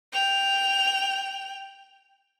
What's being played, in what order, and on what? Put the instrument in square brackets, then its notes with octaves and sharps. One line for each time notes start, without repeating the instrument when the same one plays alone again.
[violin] G5 F7